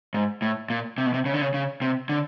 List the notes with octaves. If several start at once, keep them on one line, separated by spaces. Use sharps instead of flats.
G#2
A2
A#2
C3
B2
C3
C#3
D3
C#3
C#3
C3
D3